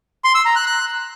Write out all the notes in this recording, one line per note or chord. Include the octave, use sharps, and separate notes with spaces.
C6
E6
A#5
F#6
F#6